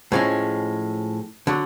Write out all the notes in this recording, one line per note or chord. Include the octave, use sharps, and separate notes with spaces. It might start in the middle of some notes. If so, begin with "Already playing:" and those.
A2 F3 G#3 C#4
D3 F#3